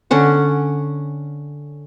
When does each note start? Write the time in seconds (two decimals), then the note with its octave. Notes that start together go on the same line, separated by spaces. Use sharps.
0.11 D3 C#4 F#5